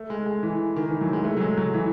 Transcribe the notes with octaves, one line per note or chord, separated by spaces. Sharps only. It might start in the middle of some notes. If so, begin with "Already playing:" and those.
Already playing: A3
G#3
G#3
E3
D#3
E3
F#3
G#3
A3
F#3
G#3
F#3
E3